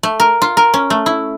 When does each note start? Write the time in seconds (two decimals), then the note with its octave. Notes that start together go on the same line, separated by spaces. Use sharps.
0.03 A3
0.20 A#4
0.42 F4
0.57 A#4
0.74 C#4
0.90 A3
1.06 E4